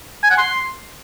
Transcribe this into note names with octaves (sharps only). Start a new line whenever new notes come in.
G#5
F#5
C6